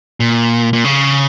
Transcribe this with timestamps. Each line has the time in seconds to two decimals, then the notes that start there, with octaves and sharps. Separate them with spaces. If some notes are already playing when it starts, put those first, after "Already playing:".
0.20 A#2
0.73 A#2
0.84 C#3